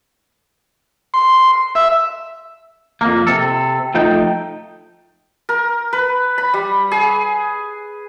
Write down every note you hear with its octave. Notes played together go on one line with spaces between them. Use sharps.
C6
E5
F2 A#3
C3 A4
F3 A3 D#4 G5
A#4
B4
B5
G3
G#4